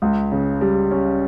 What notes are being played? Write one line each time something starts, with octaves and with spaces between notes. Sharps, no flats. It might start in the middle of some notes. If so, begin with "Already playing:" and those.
C#2
C#3
G3
C#4